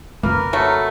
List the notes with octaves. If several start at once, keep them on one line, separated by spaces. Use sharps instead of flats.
F2 C#3 A#3 A#4 B4
F#3 A3